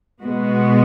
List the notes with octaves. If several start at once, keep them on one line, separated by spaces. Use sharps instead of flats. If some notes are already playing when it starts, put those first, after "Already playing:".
B2 G#3 B3 F#4